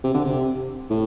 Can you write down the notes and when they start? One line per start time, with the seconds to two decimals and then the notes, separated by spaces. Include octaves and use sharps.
0.04 C3
0.14 D3
0.25 C3
0.90 A2